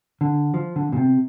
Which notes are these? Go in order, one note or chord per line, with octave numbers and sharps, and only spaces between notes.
D3
F3
D3
A#2
C3